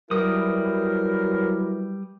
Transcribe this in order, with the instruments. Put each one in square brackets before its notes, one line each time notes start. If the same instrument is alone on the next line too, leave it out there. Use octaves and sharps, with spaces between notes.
[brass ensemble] F#3 E4 B4 [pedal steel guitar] G3 D#6 [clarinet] A#4